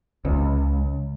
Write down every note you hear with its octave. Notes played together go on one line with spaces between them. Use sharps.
C#2